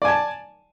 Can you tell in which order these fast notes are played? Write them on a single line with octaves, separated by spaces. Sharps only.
D5 G#5 A5